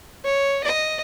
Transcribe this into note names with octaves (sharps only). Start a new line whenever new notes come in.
C#5
D#5